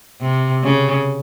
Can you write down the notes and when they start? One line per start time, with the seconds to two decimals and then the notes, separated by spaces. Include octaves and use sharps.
0.21 C3
0.63 C#3